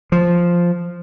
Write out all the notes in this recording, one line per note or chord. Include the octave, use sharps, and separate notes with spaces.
F3